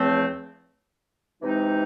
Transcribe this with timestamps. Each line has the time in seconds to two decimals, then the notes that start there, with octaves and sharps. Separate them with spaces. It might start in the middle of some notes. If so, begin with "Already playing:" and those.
Already playing: E2 C#3 F3 A3 C4
1.42 C3 E3 G#3 C4 D#4